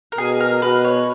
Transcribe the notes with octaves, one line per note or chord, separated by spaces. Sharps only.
A#4
B2 G#4
A#4
B2 B4
C#5